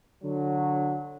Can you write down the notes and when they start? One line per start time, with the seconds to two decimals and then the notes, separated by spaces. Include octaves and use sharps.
0.23 D3 F#3